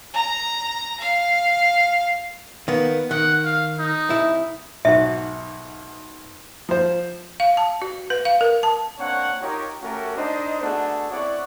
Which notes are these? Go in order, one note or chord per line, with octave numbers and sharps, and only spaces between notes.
A#5
F5
D#3 A#3 B3
D#3 F#5
F5
D#4
C2 E4
B1 G#2 F#4 E5
F3 C5
F5
A5
F#4
B4
F5
A#4
A5
A#3 C4 D4 C#5 F#5
D#4 F4 G4 A#4 C#5
A3 C#4 F#4 G4 A#4
D4 D#4 C5 D#5
A3 B3 D4 F#4 G#4 A4
C4 E4 C#5 D5 F#5 C#6